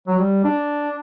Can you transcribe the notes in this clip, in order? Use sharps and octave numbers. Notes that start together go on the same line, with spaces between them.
F#3
G3
D4